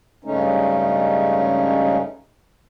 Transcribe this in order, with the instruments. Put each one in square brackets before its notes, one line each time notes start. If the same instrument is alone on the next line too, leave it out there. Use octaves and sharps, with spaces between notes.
[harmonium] G2 C#3 G#3 A3 C#4 D#4